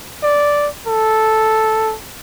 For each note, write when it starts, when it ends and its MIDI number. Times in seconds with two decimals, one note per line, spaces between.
0.23 0.68 74
0.87 1.95 69